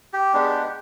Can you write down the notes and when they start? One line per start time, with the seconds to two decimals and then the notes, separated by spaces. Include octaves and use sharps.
0.13 G4
0.34 G#3 B3 D4